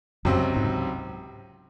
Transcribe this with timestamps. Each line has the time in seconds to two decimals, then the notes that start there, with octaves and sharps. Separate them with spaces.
0.25 C#2 F#2 C3 F#3 C4
0.57 G#2